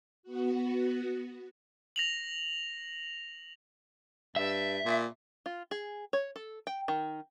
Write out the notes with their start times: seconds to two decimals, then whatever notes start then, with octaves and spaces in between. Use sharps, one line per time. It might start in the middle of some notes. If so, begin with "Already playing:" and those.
0.23 B3 F#4
1.96 A#6 F7 F#7
4.36 G2 E5
4.85 A#2
5.46 F4
5.71 G#4
6.13 C#5
6.36 A4
6.67 G5
6.88 D#3